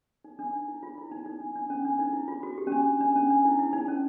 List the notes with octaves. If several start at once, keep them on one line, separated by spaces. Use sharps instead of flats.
D#4
D4
D#4
E4
F4
E4
D#4
D#4
D4
D4
C#4
D4
D#4
E4
F4
F#4
G4
C#4
D4
D4
C#4
D4
E4
E4
D#4
C#4